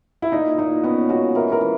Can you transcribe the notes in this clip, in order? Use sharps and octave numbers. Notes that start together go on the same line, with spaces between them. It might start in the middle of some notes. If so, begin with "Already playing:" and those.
E4
A#2 D#4
A#2 D#4
B3 C#4
G#3 F#4
E3 A#4
A#4
E3